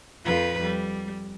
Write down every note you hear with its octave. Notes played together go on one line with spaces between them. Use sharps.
F2 F3 B4
G3